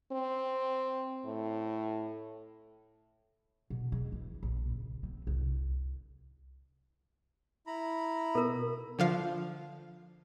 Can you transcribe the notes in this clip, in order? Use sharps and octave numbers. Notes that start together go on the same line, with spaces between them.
C4
A2
B2
G#3
E3
A#1
C#2
C4
C2
E4 A#5 B5
B2 A4 A#4
D3 F3 F5